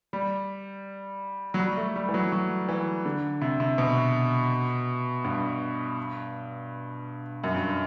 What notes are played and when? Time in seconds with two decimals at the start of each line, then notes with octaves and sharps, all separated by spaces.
0.13 G3
1.54 F#3
1.59 G3
1.77 A3
1.96 G3
2.09 E3
2.14 F#3
2.32 F#3
2.69 E3
3.05 D3
3.41 C3
3.60 C3
3.78 B2
5.25 G2
7.44 F#2
7.54 G2